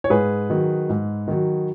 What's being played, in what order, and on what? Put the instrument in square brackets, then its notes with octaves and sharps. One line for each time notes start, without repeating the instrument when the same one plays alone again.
[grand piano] C#5
G#2 G#4 B4
D#3 F#3
G#2
D#3 F#3